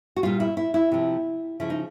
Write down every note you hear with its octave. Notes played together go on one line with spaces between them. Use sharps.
F#4
A#2 G3 F4
E4
E4
E4
C3 F3
C#3 F3 E4
D#4